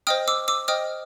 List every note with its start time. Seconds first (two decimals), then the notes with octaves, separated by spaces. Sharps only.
0.07 C5 D#5 G5 D#6 F6
0.28 D6 E6
0.48 D6 E6
0.68 C5 D#5 G5 D#6 F6